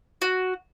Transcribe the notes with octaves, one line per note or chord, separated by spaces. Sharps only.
F#4